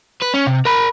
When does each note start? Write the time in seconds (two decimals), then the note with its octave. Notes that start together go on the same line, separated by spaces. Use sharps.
0.22 B4
0.34 C#4
0.47 C3
0.65 A#4 B5